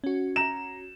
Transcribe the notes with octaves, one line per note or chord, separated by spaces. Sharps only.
C#4 F#4
A#5 E7